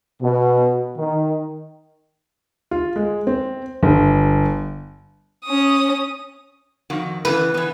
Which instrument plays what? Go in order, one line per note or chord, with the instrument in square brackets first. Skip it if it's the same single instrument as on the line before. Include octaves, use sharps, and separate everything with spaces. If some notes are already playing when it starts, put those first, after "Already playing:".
[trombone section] B2
D#3
[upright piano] F4
G#3
C4
G1
[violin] C#4 D#6
[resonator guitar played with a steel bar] F2 D#3 F#4
[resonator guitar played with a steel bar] C#3 E3 B3 [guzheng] B4
[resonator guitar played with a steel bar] E3 B3